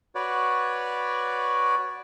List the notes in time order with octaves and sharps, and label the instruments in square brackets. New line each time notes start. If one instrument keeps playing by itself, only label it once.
[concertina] F#4 B4 C#5 D5